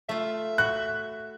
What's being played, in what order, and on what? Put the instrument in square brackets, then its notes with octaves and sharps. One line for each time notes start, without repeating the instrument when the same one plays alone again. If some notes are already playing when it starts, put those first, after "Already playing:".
[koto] A3 F4 [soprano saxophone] E5
[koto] F#4 [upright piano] F#6